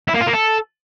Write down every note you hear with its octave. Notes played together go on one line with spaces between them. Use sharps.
E4
A#3
F4
A#3
A4